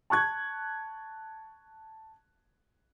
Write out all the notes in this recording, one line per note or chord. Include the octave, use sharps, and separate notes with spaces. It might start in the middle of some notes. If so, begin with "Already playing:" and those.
A5 C#6 F#6 G#6